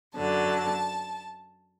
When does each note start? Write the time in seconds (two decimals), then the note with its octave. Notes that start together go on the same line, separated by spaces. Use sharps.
0.14 F#2 D3 F#3 A5